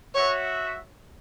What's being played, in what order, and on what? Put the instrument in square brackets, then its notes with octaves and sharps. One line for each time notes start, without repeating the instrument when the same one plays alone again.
[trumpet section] F#4 E5 [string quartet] C#5